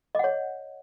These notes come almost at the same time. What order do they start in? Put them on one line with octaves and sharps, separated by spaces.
D#5 F#5 C#5